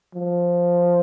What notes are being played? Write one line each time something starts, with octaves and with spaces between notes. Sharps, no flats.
F3